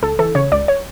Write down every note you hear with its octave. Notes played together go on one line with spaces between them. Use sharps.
C#2 A4
E3 A4
C#3 C#5
C#2 D5
C#5